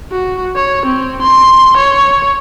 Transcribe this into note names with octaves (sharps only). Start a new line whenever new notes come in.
F#4
C#5
C4
C6
C#5